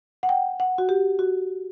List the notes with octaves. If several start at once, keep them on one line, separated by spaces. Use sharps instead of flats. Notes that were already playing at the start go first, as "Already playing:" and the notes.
F#5
G5
F#5
F#4
G4
F#4